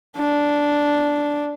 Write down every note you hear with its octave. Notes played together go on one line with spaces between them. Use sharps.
D4